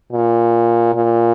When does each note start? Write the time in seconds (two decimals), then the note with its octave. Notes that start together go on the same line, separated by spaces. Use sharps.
0.13 A#2
0.94 A#2